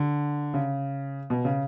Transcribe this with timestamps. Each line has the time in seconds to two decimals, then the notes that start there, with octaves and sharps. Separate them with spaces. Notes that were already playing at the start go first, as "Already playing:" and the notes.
Already playing: D3
0.54 C#3
1.30 B2
1.45 C#3